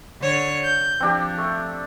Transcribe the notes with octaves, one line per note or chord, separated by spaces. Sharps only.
D3 C#5
G6
F3 C4 D4 G4
A3